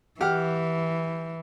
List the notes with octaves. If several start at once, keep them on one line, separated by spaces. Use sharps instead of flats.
E3 G4 F#5 F6